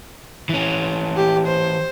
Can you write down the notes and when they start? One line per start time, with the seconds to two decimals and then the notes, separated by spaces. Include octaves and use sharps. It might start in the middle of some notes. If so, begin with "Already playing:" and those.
0.49 E3 C#4
1.17 G4
1.47 C5